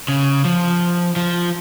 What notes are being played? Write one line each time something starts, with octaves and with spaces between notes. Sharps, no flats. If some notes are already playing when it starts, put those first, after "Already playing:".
C#3
F3
F3